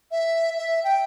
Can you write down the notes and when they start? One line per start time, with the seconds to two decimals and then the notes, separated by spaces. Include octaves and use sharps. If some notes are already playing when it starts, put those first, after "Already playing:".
0.11 E5
0.58 E5
0.84 G5